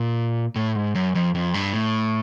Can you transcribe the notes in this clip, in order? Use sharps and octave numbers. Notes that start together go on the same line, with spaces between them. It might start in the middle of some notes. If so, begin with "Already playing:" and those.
Already playing: A#2
A2
G#2
F#2
F2
F2
G2
A2